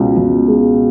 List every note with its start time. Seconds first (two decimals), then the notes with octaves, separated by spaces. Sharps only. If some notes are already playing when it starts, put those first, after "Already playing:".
Already playing: C#2 B2
0.17 C#2
0.48 G#3